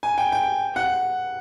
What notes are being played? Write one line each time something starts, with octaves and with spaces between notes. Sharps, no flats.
G#5
G5
G5
F#5